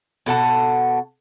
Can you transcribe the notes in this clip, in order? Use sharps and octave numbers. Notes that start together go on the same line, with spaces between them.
B2 A4 F#5 A5